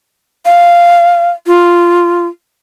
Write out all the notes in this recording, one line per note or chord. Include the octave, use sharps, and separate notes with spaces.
F5
F4